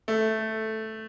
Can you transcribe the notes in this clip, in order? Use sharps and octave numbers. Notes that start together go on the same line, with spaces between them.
A3